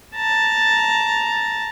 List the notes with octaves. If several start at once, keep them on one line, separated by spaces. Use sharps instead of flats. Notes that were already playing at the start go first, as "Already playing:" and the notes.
A5 A#5